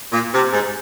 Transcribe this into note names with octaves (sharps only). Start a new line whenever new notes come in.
A#2
C3
G#2